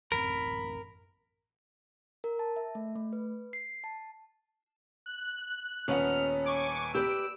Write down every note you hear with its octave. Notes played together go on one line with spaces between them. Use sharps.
A1 F#2 C4 A#4 B5
A#4
A5
E5
A3
A3
B4
C7
A5
F#6
D#1 B3 C#4 F#5 F6
G#5 C#6 D6
G4 B4 D5 E6 D7